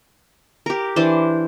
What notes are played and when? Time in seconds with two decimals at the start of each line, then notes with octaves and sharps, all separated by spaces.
0.66 G4 A#4
0.96 E3 D4 C5